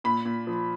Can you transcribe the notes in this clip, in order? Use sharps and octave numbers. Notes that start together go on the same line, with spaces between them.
A#2 B5
A#2
F3